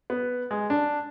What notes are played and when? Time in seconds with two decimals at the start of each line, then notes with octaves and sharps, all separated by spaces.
0.10 B3
0.51 G#3
0.70 D4